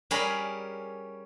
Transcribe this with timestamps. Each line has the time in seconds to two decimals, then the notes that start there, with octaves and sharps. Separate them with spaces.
0.11 G3 C#4 G#4 A#4 B5